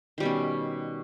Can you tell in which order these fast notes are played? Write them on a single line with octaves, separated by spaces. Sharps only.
D#3 G3 B2 C#4